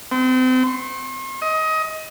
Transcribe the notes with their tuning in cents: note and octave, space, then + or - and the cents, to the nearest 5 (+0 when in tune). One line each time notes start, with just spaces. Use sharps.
C4 -35
C6 +45
D#5 +25